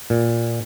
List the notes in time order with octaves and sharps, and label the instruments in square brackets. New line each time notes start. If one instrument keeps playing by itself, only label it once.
[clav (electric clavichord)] A#2